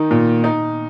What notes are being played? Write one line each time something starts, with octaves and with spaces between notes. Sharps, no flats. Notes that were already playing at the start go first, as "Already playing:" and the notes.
Already playing: D#3 D#4
A#2
D#4